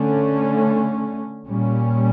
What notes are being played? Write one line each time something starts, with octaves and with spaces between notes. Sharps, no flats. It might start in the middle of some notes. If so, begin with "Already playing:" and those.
Already playing: D3 A3 C#4
A#2 G3 C#4